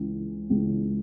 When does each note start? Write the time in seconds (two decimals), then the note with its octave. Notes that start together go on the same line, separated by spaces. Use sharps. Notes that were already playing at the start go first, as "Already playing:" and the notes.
Already playing: C#2 C#3 E3
0.50 C#2 C#3 E3